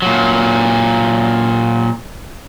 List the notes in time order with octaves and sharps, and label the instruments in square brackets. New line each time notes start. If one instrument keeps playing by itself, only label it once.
[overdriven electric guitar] A#2 F#3